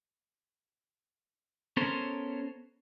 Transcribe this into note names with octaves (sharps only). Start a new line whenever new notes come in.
B3 C#4 A4 A#4 C5 C#5